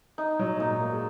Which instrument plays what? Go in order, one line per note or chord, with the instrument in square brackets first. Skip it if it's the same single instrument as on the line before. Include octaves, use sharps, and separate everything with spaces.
[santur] D#4
[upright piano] F#3
G#2
[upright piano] A#2 [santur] D#4
[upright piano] A#3
G#3